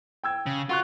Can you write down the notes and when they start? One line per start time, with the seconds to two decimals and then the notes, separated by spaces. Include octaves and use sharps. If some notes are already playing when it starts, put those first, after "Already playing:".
0.24 G5 E6 G#6
0.46 C#3
0.69 F4 F#4 C#6 F#6